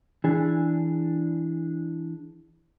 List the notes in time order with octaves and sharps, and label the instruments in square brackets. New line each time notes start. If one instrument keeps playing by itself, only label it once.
[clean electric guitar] E3 D4 G#4